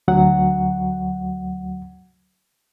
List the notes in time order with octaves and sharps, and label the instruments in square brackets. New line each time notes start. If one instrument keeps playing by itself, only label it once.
[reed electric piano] D2 F#3 F#5